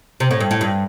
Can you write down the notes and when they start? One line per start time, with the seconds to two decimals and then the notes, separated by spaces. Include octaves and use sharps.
0.20 C3
0.31 A2
0.40 G2
0.51 A2
0.61 G2